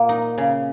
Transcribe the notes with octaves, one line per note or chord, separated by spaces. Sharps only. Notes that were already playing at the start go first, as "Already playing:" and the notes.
Already playing: A#2 A#3
D#4
C#3